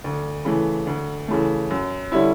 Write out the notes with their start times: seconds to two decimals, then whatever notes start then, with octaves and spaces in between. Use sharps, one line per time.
0.04 D2
0.45 C#3 E3 A3
0.87 D2
1.28 C#3 E3 A3
1.70 F#2
2.12 D3 G3 C#4 E4